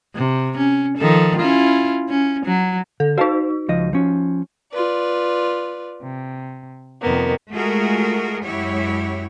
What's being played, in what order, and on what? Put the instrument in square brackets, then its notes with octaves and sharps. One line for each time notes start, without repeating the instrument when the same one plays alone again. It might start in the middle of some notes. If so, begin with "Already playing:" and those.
[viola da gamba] C3
C#4
D#3 F3 A4
C#4 E4 F4
C#4
F#3
[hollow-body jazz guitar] D3 [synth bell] A4
[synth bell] D#4 F#4 [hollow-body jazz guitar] C5 F5 A5
[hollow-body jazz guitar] C#2 F3 D#5
F3 C#4
[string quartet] F4 B4 D5
C3
F2 C3 D#3 A#3 B3
[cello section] G#3 A3 F4 F#4 G#4 A#4
F#2 G#3 E4 F#4 G4 C#5